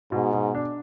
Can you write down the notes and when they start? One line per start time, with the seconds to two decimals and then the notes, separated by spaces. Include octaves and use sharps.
0.12 G#2 B2
0.33 B2
0.55 D4